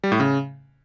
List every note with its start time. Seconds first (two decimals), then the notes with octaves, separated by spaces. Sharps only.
0.04 G3
0.12 A2
0.20 C#3